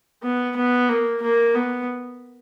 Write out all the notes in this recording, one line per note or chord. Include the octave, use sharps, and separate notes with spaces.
B3
B3
A#3
A#3
B3